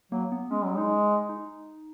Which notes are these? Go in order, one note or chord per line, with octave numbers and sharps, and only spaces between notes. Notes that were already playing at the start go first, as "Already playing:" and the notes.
F#3 A#3
B3
G#3 C#4
F#3
G#3 D#4
D#4